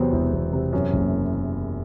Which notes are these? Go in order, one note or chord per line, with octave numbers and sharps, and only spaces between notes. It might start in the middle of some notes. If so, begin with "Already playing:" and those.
Already playing: E2 C3 F#3 B3 C4
E1 E4
E2
C3
F#2
F#1